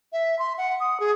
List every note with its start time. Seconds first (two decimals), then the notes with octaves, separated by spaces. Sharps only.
0.13 E5
0.39 C6
0.58 F#5
0.80 D#6
1.00 G#4